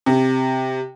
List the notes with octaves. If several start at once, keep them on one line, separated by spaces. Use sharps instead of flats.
C3